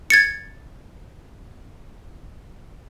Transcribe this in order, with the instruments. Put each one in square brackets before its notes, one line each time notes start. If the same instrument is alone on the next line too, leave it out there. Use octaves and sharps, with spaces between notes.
[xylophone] G#6 A6 C#7